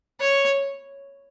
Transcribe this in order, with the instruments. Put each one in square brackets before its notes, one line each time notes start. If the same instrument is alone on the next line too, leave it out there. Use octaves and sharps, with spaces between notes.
[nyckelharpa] C#5